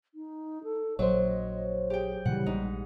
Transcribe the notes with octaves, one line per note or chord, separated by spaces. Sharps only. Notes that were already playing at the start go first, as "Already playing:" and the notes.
D#4
A4
A#1 F#3 C5 C#5 D#5
G4 G#4 G5
A#2 C#3 E3 G3 F#5
A#1 G#2 D#4